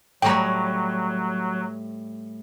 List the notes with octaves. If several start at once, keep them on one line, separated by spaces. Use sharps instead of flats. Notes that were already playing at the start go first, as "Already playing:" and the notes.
A2 F#3 G3 C#5 G5 A#5